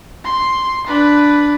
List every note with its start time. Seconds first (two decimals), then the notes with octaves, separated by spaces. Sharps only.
0.24 C6
0.87 D4 B4